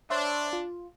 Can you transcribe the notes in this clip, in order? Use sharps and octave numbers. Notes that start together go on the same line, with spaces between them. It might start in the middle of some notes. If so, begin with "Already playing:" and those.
D4 C5 C#5 E5
F4